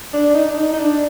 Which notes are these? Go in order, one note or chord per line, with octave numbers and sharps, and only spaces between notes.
D4
D#4
D4
D#4
D#4
D4